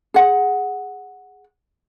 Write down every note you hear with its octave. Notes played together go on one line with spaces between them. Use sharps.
G#4 F#5